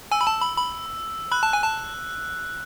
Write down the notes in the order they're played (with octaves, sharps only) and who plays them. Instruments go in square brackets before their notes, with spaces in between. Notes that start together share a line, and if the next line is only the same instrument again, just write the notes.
[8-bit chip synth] G#5 [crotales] E6
[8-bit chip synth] B5
A5
B5
B5
[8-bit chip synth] B5 [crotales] F#6
[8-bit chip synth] A5
G#5
A5